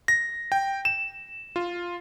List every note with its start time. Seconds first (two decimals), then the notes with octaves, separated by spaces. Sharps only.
0.08 A#6
0.52 G5
0.85 E7
1.56 F4